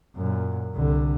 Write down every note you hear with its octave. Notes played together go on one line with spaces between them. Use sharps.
F#2 A#2
C2 D3